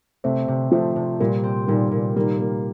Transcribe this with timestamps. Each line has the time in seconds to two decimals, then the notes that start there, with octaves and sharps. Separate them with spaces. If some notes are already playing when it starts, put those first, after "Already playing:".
0.24 C3 A3 C4
0.48 C3
0.72 C3 F3 A3
0.96 C3
1.20 A#2 G3 A#3
1.43 C4
1.68 A#2 D#3 G3
1.91 A#2
2.16 D#3 G3 A#3
2.40 A#3